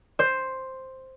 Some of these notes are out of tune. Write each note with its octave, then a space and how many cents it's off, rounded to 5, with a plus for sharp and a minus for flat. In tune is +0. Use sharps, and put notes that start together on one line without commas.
C5 +5